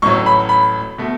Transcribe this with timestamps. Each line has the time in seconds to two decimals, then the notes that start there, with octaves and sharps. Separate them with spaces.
0.02 A1 A2 F#3 C#6
0.26 B5
0.49 B5
0.98 B2 A3